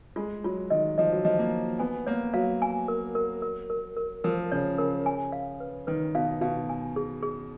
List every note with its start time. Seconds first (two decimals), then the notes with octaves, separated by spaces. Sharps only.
0.16 G#3 F4
0.44 F#3 F4
0.70 D#3 D#5
0.98 F3 D#5
1.12 F#3
1.25 F3 D#5
1.39 A#3
1.53 F4
1.79 B3 G#5
2.06 A#3 C#5
2.34 F#3 F5
2.62 G#5
2.88 A#4
3.15 A#4
3.42 A#4
3.70 A#4
3.97 A#4
4.24 F3 A#4
4.52 C#3 C#5
4.78 C#3 A#4
5.06 G#5
5.32 F5
5.60 B4
5.87 D#3 B4
6.15 B2 F5
6.41 B2 F5
6.69 G#5
6.96 G#4
7.23 G#4